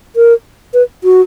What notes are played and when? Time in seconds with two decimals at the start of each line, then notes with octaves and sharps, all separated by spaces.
0.16 A#4
0.74 B4
1.04 F#4